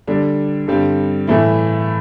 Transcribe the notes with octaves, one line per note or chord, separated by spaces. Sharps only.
D3 G3 D4
G2 D3 G3 C4
A2 E3 A3 E4